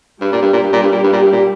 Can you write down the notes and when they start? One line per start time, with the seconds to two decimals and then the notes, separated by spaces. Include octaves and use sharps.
0.21 G2 G3 G4
0.32 A#2
0.42 G2
0.53 A#2
0.63 G2
0.73 A#2
0.83 G2
0.92 A#2
1.03 G2
1.12 A#2
1.23 G2
1.33 A#2